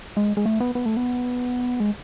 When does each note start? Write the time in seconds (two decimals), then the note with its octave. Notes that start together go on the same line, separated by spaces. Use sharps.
0.17 G#3
0.37 G#3
0.46 A3
0.60 B3
0.75 B3
0.86 A3
0.97 B3
1.80 G#3